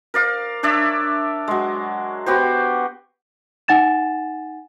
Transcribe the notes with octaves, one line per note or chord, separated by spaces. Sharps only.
A#4 D5 F5
D4 C#5 D5 E5
F#3 G#3
B3 F#4 G4 C5
D#4 F#5 G#5 A6 E7